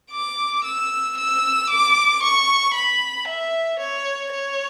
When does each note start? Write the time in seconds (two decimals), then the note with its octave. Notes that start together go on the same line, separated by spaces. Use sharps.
0.12 D6
0.64 E6
1.18 E6
1.70 D6
2.22 C#6
2.74 B5
3.28 E5
3.79 C#5
4.32 C#5